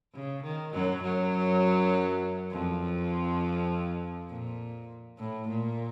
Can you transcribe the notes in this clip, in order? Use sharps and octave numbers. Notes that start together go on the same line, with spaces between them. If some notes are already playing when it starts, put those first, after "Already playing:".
C#3
D#3
F#2 F#3
F#2 F#3
F2 F3
A#2
A2
A#2